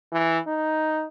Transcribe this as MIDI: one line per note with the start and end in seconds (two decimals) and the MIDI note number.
0.12 0.39 52
0.47 1.06 63